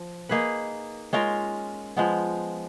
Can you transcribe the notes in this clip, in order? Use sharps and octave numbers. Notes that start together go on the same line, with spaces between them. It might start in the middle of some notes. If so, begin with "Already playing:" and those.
Already playing: F3
A#3 D#4 G#4 B4
G#3 C#4 F4 A#4
F3 G#3 B3